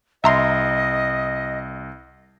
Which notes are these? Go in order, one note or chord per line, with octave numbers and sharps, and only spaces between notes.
C2 D#5 E5 A#5 C6